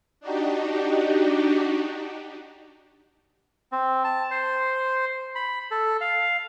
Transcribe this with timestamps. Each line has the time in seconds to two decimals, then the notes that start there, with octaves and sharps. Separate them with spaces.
0.20 D4 D#4 F#4 G4
3.72 C4
4.04 A5
4.31 C5
5.35 B5
5.71 A4
6.01 F5